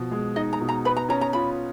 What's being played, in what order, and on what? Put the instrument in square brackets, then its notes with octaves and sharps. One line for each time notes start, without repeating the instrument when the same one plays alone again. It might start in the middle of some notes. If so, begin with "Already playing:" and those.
Already playing: [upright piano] B2 F3
G#3
[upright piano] D#4 [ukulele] D#5
[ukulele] A#5
[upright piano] B2
[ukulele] A#5
[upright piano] B4 [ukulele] B5
[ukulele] A#5
[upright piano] C#4 [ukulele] A#5
[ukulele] A#5
[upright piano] F4 [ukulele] B5